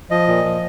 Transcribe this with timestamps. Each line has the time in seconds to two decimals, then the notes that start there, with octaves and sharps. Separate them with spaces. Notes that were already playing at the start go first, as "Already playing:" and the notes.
0.10 F3 D#5
0.27 A#2
0.44 F3